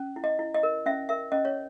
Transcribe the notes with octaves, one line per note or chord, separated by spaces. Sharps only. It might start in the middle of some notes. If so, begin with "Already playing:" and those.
Already playing: C#4
E4
D#5
E4
D#5
A#4
C#4 E5
A#4 E5
C#4 D#5
C#5